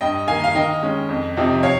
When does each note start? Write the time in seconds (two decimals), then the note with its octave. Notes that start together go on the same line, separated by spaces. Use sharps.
0.01 G2 D#5 G5
0.27 D#3 A#3 F5 G#5
0.44 F5
0.55 D#3 D#5 G5
0.82 G#3 C#4
1.09 F2
1.37 C3 F3 C4 D#4
1.63 C#5 F5